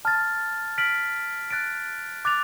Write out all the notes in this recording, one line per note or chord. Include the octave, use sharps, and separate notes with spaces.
A5 F6 A6
F6 B6 D7 F#7
F#6 A6 D7
D6 F#6 A6 F7